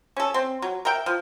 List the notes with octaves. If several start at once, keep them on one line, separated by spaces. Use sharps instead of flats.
C#4 A4
C4
F#3
A#4 E5 G5
F3